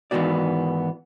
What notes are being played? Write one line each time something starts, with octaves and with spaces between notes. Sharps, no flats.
G#2 D#3 E3 B3 F#4 D5